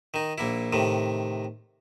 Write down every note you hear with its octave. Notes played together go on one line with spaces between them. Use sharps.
D#3 D#4
A#1 A#3 E4
A2 C3 D#3